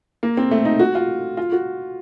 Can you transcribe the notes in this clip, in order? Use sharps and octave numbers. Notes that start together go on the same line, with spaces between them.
A#3
C4
A3
D#4
F#4
F4
F4
F#4